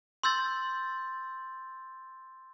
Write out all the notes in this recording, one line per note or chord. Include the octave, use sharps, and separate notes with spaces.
C6 E6 G6 A6 F#7